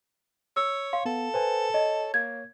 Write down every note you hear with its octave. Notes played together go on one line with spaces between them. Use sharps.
C#5 E6
F5 C6
B3 A4
B4 C5 G#5
C#5 D#5
A#3 G#6